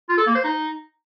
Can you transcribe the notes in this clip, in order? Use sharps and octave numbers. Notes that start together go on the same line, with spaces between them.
F4
A4
A#3
C5
D#4